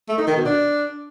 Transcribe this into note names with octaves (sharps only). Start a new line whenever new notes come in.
A3
D#4
D#3
B2
D4